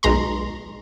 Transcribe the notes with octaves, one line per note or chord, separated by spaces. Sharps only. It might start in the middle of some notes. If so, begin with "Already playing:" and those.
B1 G#3 A#5 C6